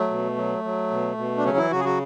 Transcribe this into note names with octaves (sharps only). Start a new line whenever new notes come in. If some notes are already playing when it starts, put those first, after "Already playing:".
Already playing: F#3 A3
B2
F#3
F#3
B2
B2
D4
C#3 F#3 C#4
E3 E4
C#3 F#3 F#4
G#4
F#3 F#4